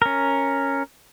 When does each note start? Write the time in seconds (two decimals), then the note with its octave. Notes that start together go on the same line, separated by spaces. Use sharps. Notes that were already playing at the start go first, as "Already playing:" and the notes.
0.02 C#4 A#4